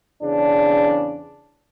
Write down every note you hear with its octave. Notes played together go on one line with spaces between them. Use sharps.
E2 C#3 D4